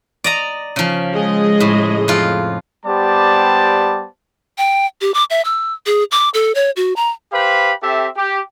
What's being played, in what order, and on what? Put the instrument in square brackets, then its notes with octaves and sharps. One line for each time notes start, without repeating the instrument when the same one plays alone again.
[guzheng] D5 D#5 A#5
C#3 F3
[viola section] G#3 G#4 D#5
[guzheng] A2
F2 F4
[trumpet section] G3 B3 G4 C5 D5 A5
[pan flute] G5
G4
D6
E5
E6
G#4
D6
A4
C#5
F#4
A#5
[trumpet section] G4 B4 C5 F5 B5
C4 G4 A4 E5
G4